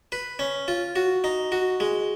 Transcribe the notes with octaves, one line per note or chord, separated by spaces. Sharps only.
B4
C#4
F4
F#4
D#4
F#4
G#3